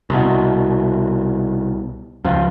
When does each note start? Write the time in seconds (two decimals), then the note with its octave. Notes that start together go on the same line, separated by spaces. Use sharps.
0.10 C2 B2
2.24 C#2 F3